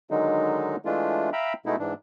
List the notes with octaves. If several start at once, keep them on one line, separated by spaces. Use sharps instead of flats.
D3 D#3 F#3 G#3 D#4
E3 G#3 A3 D4 F4
E5 F5 G5 A#5 B5
B2 G#3 A3 B3 D#4 E4
G#2 E3 D4